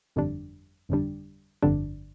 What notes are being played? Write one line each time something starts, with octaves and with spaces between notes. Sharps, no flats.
G1 F2 D3 G3 D4
G1 F2 D3 G3 D4
G1 F2 D3 G3 D4